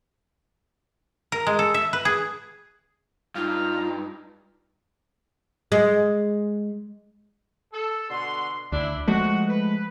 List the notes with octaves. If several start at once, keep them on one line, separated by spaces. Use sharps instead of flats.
A#4
G#3
A4
E5
B4
G#4
G2 D#4 F4 F5
G#3
A4
B2 D3 C6
D2 D4 E4
F3 G#3 A3 F#4
B4